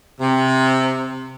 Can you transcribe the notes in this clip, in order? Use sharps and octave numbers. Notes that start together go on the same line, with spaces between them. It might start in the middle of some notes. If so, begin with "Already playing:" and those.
C3